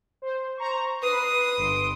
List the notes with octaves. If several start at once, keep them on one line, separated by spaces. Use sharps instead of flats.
C5
C5 A#5 C#6
B4 D#6 C7
G1 C6 D7